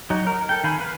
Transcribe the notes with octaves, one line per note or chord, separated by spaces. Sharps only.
F#3 D#4 F#4
A#4
A4 G5
D#3 F5 G#5 B5
B4 F5